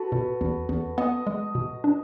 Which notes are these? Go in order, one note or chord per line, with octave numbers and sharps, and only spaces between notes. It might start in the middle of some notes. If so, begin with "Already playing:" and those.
Already playing: F#4 A4 B4
B2
E2
E2
B3 D#5
G#3
B2
D4